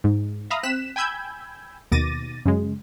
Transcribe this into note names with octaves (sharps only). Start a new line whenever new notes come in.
G#2
E5 F5 A#5 B5 D#6
C4 F#6 B6 E7
G5 G#5 B5 E6 G6 G#6
D#2 B2 D6 A6 A#6 D#7
F#2 C#3 G#3